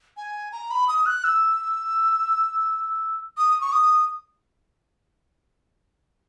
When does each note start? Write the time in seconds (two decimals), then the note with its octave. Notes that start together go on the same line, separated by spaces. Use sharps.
0.17 G#5
0.52 A#5
0.71 B5
0.88 D#6
1.06 F#6
1.24 E6
3.37 D#6
3.61 C#6
3.73 D#6